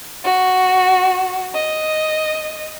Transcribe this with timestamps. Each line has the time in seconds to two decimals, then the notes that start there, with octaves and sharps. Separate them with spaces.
0.24 F#4
1.54 D#5